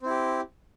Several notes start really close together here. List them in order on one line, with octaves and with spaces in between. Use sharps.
C4 E4 G4